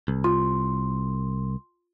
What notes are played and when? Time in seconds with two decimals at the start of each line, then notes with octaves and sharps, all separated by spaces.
0.08 C2
0.24 F4 C6